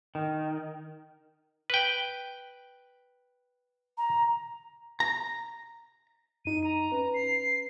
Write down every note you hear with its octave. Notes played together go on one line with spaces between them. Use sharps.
D#3
B4 G5
A#5
A#5
F#2 D#4 D#7
A#5
C#4 B4
C7